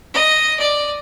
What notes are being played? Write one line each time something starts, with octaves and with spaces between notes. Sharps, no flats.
D#5
D5